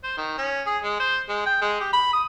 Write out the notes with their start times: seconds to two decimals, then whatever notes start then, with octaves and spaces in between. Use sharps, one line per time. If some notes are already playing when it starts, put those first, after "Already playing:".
0.03 C5
0.17 D#3
0.37 C#4
0.66 G#4
0.83 G#3
1.00 C5
1.29 G#3
1.46 G5
1.61 G#3
1.80 G4
1.93 B5
2.13 D#6